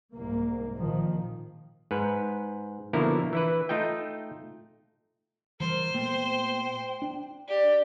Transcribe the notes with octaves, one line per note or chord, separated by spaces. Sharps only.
C2 G#2 A#3
A#1 A#2 D#3 F3
G#2 B4
B2 D3 F3 A#3 E4 A#4
E3 E4 B4
A3 D#4 F4 D#5 G5
E3 G3 A#4 C5
A#2 A3 B3 G5
D4
G4 D5